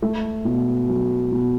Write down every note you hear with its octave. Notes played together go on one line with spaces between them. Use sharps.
A3
B2
F#3
B2